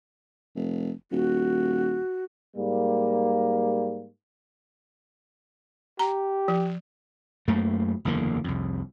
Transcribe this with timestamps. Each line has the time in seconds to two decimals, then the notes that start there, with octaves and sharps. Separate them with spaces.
0.55 F1
1.12 D#1 F#4
2.57 G#2 G3 A#3
5.99 G4 A#5
6.48 F3
7.48 F#2 A3 A#3
8.05 F#1 E2 D3 A#3
8.44 C2 F2